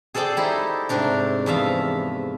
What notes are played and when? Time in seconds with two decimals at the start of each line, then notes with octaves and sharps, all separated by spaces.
0.14 G#4 A4 C5 D5 G5 A5
0.37 D#4 E4 G4
0.89 G#2 C3 A3 D4 A#4
1.46 E2 F3 E5 F5